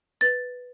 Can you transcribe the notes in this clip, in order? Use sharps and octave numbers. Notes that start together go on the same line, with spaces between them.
B4 A6